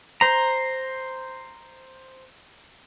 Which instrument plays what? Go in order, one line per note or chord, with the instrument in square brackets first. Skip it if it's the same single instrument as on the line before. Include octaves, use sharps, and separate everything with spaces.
[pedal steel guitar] C5 A#5